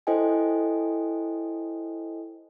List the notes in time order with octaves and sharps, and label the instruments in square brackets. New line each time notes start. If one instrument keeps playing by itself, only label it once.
[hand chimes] E4 A4 C5 D#5 G5 G#5